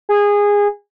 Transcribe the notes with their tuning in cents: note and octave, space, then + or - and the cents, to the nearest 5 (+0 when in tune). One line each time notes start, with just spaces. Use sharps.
G#4 -20